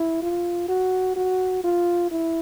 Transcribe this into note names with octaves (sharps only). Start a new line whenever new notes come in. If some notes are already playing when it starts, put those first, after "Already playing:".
Already playing: E4
F4
F#4
F#4
F4
E4